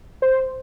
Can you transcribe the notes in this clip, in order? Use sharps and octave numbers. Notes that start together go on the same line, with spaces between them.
C5